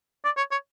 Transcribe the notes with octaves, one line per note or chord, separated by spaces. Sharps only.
D5
C#5
C#5